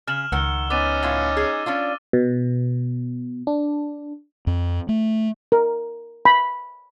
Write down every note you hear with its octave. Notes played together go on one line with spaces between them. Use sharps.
C#3 F6 E7 F#7
C#2 D#3 F#5 E6 G7
B3 C#4 D#4 D6 A6 D#7
A2 B3 F4
G#4
C#4 D4 F4
B2
D4
F2
A3
A#4
B5